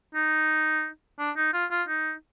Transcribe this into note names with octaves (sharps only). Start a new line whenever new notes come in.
D#4
D4
D#4
F4
F4
D#4